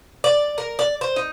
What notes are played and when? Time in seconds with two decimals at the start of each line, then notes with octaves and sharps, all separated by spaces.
0.24 D5
0.58 A#4
0.79 D5
1.01 C5
1.16 D#4